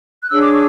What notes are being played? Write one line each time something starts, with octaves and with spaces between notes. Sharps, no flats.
F#6
D4 G#4 C#5 E6
D6
C#6